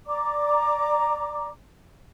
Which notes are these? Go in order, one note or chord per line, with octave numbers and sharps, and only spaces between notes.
D5 A#5 D6